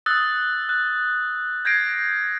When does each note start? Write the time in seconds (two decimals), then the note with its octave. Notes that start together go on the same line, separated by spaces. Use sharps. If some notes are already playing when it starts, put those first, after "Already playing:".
0.06 D#6 E6 F#6 A6
0.69 F#6
1.65 G6 G#6 A#6 C7 D7